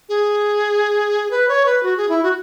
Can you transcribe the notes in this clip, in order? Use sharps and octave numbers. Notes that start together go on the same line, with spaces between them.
G#4
B4
C#5
B4
F#4
G#4
E4
F#4